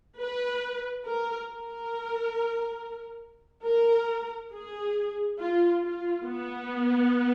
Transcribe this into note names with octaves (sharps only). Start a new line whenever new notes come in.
B4
A#4
A#4
A#4
G#4
F4
F4
B3